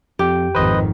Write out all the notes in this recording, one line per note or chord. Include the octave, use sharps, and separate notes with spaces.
F2 G4
G#1 F2 D#3 B4 C5 D#5